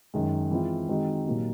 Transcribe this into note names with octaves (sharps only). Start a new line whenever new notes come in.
F#2 D#3 G#3
E3 G#3 C4 F4
D#3 G#3 C4 D#4 F#4
A#2 F#3 A#3 D#4 G4